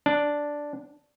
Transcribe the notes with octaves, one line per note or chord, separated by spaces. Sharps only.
D4